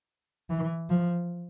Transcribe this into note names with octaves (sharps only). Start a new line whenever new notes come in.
E3
F3